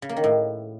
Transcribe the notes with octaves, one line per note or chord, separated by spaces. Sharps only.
C#3
A#3
D#3
A2